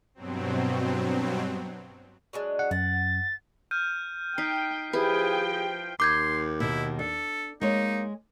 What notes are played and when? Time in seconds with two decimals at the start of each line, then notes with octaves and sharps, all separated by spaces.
0.15 G2 B2 F#3 C4
2.33 F#3 G#3 D4
2.59 F#5
2.71 F#2 F#5 A6
3.71 F6 G6 D#7
4.38 D#4 G5 B6 C7
4.93 F3 E4 G4 G#4 B4 G5
6.00 D#2 C6 D6 G6 G#6
6.60 B2 D#3 E4
6.99 D4 A4
7.61 G#3 A#3 D#4 C#5